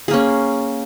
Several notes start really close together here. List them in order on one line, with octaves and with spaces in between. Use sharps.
G#4 A#3 C#4